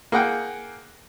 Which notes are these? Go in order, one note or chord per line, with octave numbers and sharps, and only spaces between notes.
A#3 G#4 F#5 G5